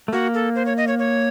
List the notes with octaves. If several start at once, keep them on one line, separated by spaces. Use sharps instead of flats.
A3
A#3 F#4
A4
C5
C#5
D#5
C#5
C#5